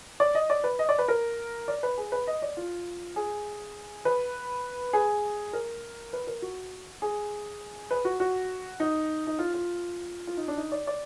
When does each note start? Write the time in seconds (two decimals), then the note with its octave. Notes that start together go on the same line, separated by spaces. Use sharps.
0.20 D5
0.35 D#5
0.50 D5
0.64 B4
0.79 D#5
0.89 D5
0.99 B4
1.08 A#4
1.68 D5
1.83 B4
1.98 G#4
2.12 B4
2.27 D#5
2.42 D5
2.57 F4
3.16 G#4
4.05 B4
4.93 G#4
5.53 A#4
6.13 B4
6.27 A#4
6.42 F#4
7.02 G#4
7.91 B4
8.05 F#4
8.20 F#4
8.80 D#4
9.27 D#4
9.39 F4
9.54 F4
10.27 F4
10.37 D#4
10.48 D4
10.57 D#4
10.72 D5
10.87 D5